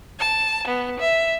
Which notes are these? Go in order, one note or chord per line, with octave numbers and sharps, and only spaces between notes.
A5
B3
E5